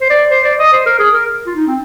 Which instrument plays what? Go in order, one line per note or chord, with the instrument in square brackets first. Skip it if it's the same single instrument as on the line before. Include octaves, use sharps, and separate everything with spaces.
[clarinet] C5
D5
C5
D5
D#5
C5
A#4
G#4
A#4
F4
D#4
C4